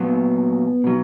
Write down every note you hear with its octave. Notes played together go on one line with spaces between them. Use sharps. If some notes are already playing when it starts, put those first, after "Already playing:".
Already playing: A#2 F#3 B3
B2 F#3